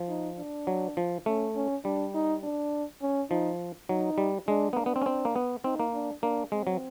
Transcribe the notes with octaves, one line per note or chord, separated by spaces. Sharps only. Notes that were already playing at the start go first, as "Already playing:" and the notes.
Already playing: F3
D#4
D4
F#3
F3
A3 C#4
C#4
G3 D4
D#4
D4
C#4
F3 D#4
F#3 D#4
G3
G#3 D4
B3
A#3 D4
B3
C4
C#4
C4
A#3
B3
C4 D#4
A#3
D4
A#3 D4
G#3 C4
F#3